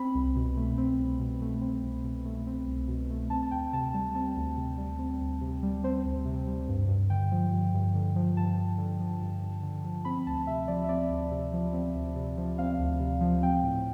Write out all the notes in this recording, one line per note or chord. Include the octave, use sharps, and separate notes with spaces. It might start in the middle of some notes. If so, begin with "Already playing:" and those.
Already playing: C4 B5
C2
B2
A3
C4
C2
B2
A3
C4
C2
B2
A3
C4
C2
B2
A3
C4 A5
A5
D2 G5
C3 A5
G3 A5
C4 A5
D2
C3
G3
C4
D2
C3
G3
C4 C5
D2
C3
G3
G2
G2
D3 G5
F3
G2
G2
D3
F3
G2 A5
G2
D3
F3
G2
G2
D3
F3
C4 B5
D2 A5
C3 E5
F3 D5
E5
C4 D5
D2
C3
F3
C4
D2
C3
F3
C4 F5
D2
C3
F3
C4 G5
A2